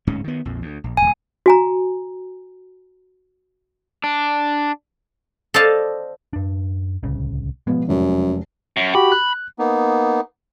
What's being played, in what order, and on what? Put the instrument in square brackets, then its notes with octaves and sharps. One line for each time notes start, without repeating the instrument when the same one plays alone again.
[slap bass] D1 G#2 C#4
D#3 B3
A#1 F2
D2
A#1
[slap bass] D1 B1 [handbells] G#5
[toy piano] F#4 G#5 A#5
[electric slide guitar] D4
[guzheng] A4 C5 D5 D#5 F5 A5
[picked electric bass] F#2 D4
D1 C2 C#3
[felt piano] B2 B3 [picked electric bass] F3 G#3
[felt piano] F1 [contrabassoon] F#2
[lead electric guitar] F#2
[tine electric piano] F#4 G4 [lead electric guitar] B5
[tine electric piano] F#6
[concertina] A#3 B3 D#4